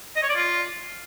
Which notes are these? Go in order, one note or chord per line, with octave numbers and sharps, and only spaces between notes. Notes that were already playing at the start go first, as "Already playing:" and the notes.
D#5
C#5
D5
F4